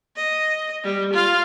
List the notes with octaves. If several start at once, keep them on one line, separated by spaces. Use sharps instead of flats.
D#5
G3
F4 F5